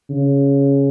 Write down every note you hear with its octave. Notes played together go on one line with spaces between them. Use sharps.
C#3